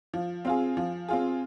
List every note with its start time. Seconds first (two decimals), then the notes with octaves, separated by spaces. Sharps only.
0.14 F3
0.45 C4 F4 G#4
0.77 F3
1.08 C4 F4 G#4